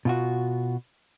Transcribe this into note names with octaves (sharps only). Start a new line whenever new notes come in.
B2 F4 F#4